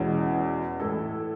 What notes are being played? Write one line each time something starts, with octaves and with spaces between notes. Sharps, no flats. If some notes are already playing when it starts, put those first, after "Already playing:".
Already playing: E2 B2 G#3 C#4 E4
A2 E3 A3 E4 A4